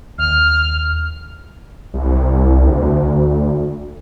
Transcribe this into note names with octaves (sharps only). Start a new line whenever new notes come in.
D#2 F6
C2
D2